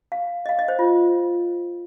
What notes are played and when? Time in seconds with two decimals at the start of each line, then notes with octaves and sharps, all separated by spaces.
0.12 F5
0.46 D#5
0.49 F5
0.59 D#5
0.68 C5
0.79 F4